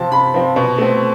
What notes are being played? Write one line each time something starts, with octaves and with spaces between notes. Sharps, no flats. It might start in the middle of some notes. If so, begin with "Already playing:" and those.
Already playing: C3 F3 C4 A5
C3 B5
F3 C4
B2
A3 C4